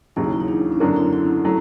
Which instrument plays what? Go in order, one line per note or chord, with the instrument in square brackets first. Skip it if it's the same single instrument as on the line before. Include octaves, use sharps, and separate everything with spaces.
[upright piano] E1 D#2 C#3 F#3 [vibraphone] E4
[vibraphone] D#4
E4
D#4
D4
C#4
[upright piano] F#2 D3 F#3 A#3 [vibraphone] C4
[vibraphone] E4
E4
[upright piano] F#3 A3